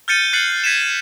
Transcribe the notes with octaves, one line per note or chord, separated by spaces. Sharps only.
F6 G6 A6 C#7 D#7 G7
F#6 A6 C7 C#7 F#7
G#6 B6 C#7 D#7 E7